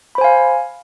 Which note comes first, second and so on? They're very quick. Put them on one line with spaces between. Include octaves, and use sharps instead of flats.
B5 C5 G#5 F5